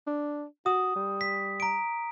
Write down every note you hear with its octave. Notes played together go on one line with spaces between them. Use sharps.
D4
F#4 D#6
G3
B6
A#5 D7